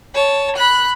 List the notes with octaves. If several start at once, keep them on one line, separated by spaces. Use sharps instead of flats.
C#5 A5
B5 F#6